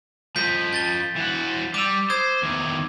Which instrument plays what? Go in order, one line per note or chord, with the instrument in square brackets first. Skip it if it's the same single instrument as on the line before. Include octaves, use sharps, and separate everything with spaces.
[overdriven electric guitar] F3 D#5 [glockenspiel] G6 B6
[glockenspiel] G6 A6 G7
[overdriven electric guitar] E3 F#4
[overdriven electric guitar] G3 [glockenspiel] D6 E6
[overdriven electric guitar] C5 [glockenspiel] D#6 G#6
[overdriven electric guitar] E2 D#3